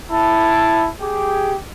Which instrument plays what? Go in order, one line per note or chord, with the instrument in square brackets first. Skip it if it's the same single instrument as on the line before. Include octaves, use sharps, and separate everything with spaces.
[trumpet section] E4 A5
G4 G#4